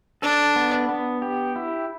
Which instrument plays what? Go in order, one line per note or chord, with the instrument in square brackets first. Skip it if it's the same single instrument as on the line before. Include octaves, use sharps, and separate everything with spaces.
[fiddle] D4 [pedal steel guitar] A4
[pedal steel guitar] B3
B3
G4
E4